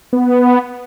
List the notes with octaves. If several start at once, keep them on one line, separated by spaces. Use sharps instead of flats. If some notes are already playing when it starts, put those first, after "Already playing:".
B3